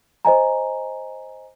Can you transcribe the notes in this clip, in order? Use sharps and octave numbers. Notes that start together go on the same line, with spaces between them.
C5 D#5 G#5 A#5